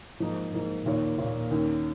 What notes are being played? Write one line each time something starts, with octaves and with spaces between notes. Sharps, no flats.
G#2 F3 A#3 D#4
G#2 F3 A#3 D#4
D#2 A#2 D#3 A#3 F4 C#5
D#2 A#2 D#3 A#3 F4 C#5
D#2 D#3 C#4